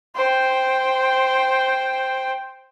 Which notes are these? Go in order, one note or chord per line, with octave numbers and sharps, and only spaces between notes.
C5 G5